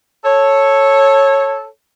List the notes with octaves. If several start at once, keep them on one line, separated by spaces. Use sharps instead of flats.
A4 C#5